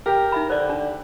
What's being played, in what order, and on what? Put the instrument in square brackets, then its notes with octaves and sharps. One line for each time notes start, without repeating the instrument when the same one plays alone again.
[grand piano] G4 [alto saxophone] A#4
[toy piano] D#4 E5 B5
[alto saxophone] D3 [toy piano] C5 D5
[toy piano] D4